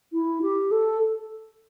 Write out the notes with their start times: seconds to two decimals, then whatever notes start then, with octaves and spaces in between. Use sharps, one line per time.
0.13 E4
0.42 G4
0.71 A4